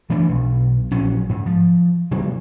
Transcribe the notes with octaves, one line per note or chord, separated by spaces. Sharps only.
E3 A3 D4
B1
A#1 F#3 C#4
G#2
F3
C3 F#3 G#3 A#3